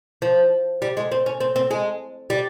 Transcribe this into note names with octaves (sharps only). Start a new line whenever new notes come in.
F3
G3
G#3
C4
C#4
C4
C4
G#3
G3